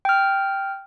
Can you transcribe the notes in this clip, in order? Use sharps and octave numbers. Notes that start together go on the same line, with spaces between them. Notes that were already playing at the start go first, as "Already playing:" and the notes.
G5 F6